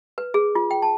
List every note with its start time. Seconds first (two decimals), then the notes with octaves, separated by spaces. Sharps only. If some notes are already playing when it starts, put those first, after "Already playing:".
0.18 B4
0.34 G#4
0.55 F4
0.71 G5
0.82 A5